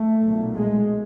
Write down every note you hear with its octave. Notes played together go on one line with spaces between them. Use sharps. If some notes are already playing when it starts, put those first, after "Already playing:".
Already playing: A3
B1 A#2
G#3